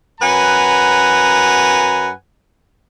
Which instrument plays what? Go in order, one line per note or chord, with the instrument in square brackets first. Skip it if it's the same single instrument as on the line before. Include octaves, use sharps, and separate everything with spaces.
[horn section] F#2 B4 F#5 G#5 A#5